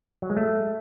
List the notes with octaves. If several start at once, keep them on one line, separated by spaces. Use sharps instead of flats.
F#3
G#3
A3